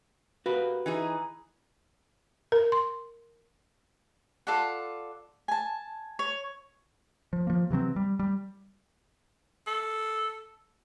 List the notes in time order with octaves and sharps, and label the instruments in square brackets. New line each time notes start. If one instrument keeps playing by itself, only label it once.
[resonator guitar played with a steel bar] A#3 [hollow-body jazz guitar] F#4 G4 B4
[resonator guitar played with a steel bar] E3 D#4 G#4
[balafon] A#4
C6
[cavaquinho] F4 A4 D5 F#5
G#5 A5
C#5
[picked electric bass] F3
F3 A#3
C3 E3 F#3 C4
G3
G3
[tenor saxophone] A4